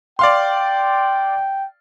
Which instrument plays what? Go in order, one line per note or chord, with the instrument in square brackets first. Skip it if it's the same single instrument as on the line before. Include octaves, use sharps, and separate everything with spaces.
[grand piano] D5 F5 C6 [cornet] G5